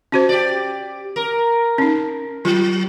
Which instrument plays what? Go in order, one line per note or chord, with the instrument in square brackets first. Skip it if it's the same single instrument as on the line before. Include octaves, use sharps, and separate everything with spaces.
[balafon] C#4 F#4 C5
[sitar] G4 D5
A#4
[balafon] C#4 D#4
[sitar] F#3 [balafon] F4